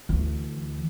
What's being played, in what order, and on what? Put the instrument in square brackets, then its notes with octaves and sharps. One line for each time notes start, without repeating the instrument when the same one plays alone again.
[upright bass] D2 E3